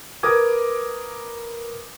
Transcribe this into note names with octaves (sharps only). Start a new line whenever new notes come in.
A#4 B4 D6 D#6 G#6